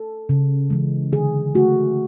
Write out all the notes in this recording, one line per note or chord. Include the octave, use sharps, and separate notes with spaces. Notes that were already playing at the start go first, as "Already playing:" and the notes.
Already playing: A4
C#3
E3 G#3
D3 G#4
A3 F#4